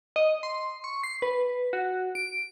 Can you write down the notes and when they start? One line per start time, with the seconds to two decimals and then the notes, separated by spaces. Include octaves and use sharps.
0.16 D#5
0.43 C6
0.84 C#6
1.03 C7
1.22 B4
1.73 F#4
2.15 D7